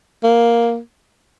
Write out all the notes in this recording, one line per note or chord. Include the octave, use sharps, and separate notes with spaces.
A#3